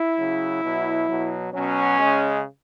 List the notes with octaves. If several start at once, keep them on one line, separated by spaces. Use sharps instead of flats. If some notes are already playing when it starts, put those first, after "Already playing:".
Already playing: E4
C#3 F#3
B2 F#3
B2 F#3
B2 F#3 C#4
C#3 G#3